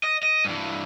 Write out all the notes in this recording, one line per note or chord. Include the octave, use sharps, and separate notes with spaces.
D#5
D#5
G2 E3